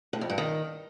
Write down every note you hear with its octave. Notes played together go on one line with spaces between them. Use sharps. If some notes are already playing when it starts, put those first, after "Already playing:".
A2
F2
G2
D#3